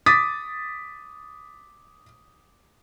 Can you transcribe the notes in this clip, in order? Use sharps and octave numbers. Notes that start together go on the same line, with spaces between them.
D6 D#6 A6 B6